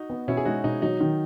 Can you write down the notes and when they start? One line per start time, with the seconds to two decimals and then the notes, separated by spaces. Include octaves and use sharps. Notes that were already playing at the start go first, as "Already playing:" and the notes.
Already playing: D#4 F#4
0.10 B3
0.28 B2 C#4 E4
0.37 G#4
0.45 G#3 D#4 F#4
0.64 B2 D#4
0.82 F#3 D#4
1.01 D#3